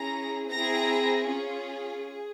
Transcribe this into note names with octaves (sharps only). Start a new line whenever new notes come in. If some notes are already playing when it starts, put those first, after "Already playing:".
Already playing: C#4 E4 G#4 A#5 A#6
C4 E4 G#4 A#5 A#6
C#4 F4 G#4
G#4